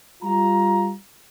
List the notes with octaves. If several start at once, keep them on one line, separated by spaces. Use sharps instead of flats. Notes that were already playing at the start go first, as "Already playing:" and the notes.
G3 F4 A#5